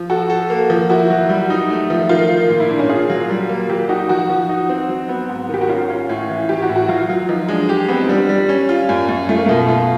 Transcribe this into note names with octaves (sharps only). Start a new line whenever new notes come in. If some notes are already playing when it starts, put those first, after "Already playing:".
Already playing: F3
F#4 A4
A4
A#3
F3
E4 F#4
F#3
G3
D#4
A3
F3
D#3 F4
D#3
A#2
E4
A#2 D4
C#4
F4 G#4
F#3
G3
A#3
F#3 G4
D#4 F#4
F3 F#4
F3
D#4
C4
F#3
B3
G#2
D#3 G4
F#4
C#4 F4
C#4
A2
E3
A2 G4
F#4
A2
F#4
F#3 F4
F#3
F3 D#4
G#3 D4
G4
B3 C4
D#4
G3 D4
G3
C#4
F4
F#2
F#2
A3 F4
A#3
B2 A3
A3 F4